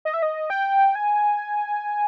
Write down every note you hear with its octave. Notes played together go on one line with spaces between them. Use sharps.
D#5
E5
D#5
G5
G#5